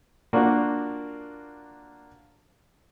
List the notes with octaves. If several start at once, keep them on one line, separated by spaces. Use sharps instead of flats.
A#3 D4 F4 F#4 A#4